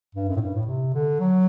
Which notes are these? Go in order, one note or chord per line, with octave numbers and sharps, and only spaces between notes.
G2
F#2
A2
G2
A2
C3
D3
F#3